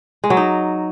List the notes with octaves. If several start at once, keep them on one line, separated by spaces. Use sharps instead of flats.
G#3
F#3
D#4